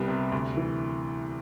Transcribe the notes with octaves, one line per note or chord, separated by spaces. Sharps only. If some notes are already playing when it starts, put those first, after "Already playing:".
Already playing: C2 G3 B3
C3
D2
E3